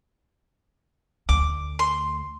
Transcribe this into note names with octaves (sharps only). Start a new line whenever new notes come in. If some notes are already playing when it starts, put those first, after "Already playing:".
D2 D6
C6